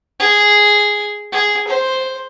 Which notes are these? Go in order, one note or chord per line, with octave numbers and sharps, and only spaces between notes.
G#4
G#4
C5